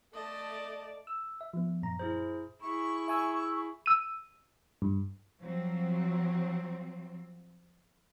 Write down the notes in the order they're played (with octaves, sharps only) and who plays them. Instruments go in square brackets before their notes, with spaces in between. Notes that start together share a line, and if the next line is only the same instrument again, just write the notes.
[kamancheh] A3 D5 [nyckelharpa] D#5 A5
[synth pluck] E6
E5
F3 B3
F#2 A#2 A#5
[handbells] E4 G#4 C5
[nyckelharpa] E4 G#4 [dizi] C#6
[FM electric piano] E5 G#5 E6
[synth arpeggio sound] E6 D#7
[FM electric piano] G2
[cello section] F3 F#3 C4